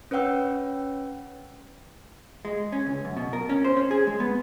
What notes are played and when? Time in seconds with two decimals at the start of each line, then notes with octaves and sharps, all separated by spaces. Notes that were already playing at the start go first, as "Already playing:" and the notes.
0.11 C#4 B4 C#5 F#5 G5 E6
2.45 G#3
2.73 C#4
2.86 C#2
3.05 F#2
3.17 B2
3.33 A#4
3.49 C#4
3.64 C5
3.77 C#4
3.91 G#4
4.07 G#3
4.20 B3